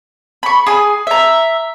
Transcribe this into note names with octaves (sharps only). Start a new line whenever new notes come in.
B5 C#6
G#4 G#5
E5 A#5